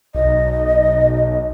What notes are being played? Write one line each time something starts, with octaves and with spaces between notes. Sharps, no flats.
B1 D#5